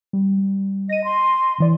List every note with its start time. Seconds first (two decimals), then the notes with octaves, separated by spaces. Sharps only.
0.13 G3
0.89 D#5 A#6 D#7
1.04 C6
1.58 D3 E3 D5